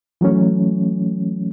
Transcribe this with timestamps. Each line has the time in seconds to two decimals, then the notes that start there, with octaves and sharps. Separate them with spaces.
0.21 E3 F#3 A3 C#4